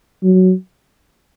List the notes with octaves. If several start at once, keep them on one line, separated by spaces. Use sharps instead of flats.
F#3